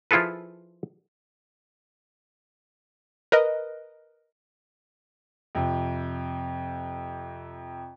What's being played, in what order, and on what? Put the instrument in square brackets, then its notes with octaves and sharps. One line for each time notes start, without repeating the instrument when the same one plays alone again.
[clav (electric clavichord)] F3 E4 F4 G#4 A4 B4
[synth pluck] A#4 B4 D#5
[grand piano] F2 C3